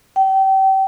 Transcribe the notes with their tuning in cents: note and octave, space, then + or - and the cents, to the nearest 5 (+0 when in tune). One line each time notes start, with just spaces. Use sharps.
G5 -30